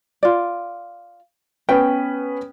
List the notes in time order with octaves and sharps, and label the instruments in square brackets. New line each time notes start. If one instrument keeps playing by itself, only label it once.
[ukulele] F4 D5
[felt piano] B3 C#4 B4 [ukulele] G5